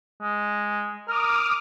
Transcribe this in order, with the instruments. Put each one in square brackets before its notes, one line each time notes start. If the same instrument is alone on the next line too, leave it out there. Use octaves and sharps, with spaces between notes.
[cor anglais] G#3
[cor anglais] A#4 [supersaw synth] D6 D#6 F6